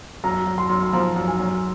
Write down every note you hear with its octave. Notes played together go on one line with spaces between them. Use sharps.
F#2 A#5
F#2
C6
F#2
C6
F3 A#5
F#2
G#5
F#2